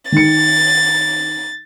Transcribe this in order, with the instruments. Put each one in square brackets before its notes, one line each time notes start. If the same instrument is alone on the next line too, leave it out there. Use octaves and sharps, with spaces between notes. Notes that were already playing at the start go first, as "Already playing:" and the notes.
[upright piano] D#3 C#7 [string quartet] A6